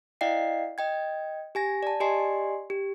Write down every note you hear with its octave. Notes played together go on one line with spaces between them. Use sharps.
E4 D5 D#5 F5 G5 C7
D#5 G5 G#6
G4 G#5 A#6
D5 A5
G4 D5 D#5 G#5 C6 C7
G4